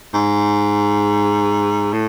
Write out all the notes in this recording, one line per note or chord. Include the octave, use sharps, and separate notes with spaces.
G#2
A2